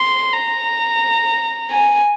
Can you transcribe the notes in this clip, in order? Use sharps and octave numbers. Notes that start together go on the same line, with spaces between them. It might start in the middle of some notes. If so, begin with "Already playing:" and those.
Already playing: C6
A#5
G#5